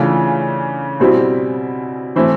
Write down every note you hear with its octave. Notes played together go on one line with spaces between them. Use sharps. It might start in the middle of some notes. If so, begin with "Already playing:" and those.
Already playing: C#3 E3 A3 D4 F4
B2 G3 C4 E4
E3 A3 C4 E4